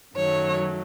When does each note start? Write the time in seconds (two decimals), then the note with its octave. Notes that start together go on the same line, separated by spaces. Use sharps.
0.15 F#2 D#3 F#3 A3 C#5